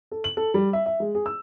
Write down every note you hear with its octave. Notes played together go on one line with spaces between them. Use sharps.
A4
F#7
A4
G3
E5
E5
G#3
G#4
E6